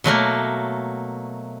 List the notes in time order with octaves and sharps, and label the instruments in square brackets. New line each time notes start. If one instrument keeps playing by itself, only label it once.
[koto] B2 F#3 A3 A#3